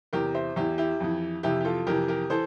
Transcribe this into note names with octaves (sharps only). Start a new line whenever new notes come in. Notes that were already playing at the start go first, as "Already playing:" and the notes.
E2 C3 E3 G4 A#4
C5 E5
E2 E3 E4 G4
E4 G4
F2 E3
F2 C3 E3 E4 G4
G4
F4 A4
F2 C3 E3 G4 A#4
G4 A#4
E3 A4 C5